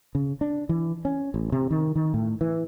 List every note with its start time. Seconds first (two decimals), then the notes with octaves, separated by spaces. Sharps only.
0.15 C#3
0.41 D4
0.69 E3
1.05 C#4
1.34 A1
1.52 C3
1.71 D#3
1.96 D#3
2.14 A2
2.41 E3